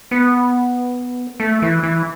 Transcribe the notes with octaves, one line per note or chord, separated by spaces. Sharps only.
B3
A3
E3
E3